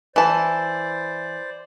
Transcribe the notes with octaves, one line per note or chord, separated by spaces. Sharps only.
E3 C5 D5 A5